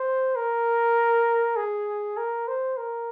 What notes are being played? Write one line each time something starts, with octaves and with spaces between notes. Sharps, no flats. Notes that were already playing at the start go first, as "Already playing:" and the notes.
Already playing: C5
A#4
G#4
A#4
C5
A#4